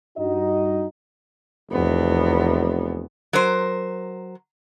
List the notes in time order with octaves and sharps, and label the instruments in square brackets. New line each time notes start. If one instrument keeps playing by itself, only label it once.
[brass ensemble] G2 D#4 F#4 D#5
[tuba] F1 [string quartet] E2 B3
[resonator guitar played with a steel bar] F#3 A#4 C5